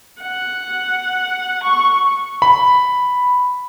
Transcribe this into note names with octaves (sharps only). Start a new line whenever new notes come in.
F#5
C#6
B5